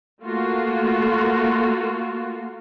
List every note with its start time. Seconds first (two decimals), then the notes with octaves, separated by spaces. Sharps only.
0.23 A3 A#3 F4 F#4